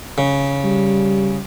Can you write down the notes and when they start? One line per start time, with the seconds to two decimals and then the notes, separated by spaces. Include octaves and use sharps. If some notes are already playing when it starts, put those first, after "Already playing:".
0.18 C#3
0.64 G3